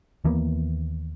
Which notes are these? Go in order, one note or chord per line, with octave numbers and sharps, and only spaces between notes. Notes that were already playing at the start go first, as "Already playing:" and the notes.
D#2 E3 A#3 B3